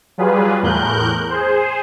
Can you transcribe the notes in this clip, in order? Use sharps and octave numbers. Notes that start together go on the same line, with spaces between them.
F#3 G3 F4 G#4 B4
E2 A2 A#4 F#6 G6
G#4 C5